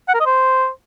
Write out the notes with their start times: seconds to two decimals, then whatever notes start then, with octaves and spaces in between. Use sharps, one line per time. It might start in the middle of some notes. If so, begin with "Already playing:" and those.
0.09 F#5
0.14 A#4
0.20 D#5
0.26 C5